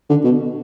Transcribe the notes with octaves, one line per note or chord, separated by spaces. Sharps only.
D3
B2